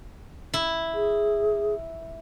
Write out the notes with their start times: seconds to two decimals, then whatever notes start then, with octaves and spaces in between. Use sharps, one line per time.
0.54 E4
0.94 G#4